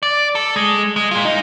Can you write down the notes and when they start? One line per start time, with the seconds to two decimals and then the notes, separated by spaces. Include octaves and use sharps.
0.03 D5
0.35 A4
0.56 G#3
0.96 G#3
1.11 A#2 F4
1.25 D#4